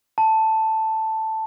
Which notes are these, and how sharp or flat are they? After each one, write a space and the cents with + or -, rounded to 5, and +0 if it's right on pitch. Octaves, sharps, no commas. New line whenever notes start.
A5 +5